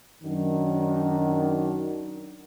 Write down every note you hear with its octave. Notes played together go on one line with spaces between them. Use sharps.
F#2 D#3 F#3 D4